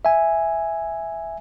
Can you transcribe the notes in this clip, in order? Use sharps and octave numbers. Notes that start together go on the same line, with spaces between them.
E5 G#5